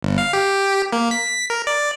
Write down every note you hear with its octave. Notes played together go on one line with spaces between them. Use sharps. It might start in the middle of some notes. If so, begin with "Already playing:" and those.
G1
F5
G4
A#3
B6
A#4
D5